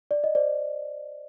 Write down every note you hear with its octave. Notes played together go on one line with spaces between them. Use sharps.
D5
D#5
C5 D5